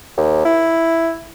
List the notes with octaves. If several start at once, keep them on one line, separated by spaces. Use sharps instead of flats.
D#2
E4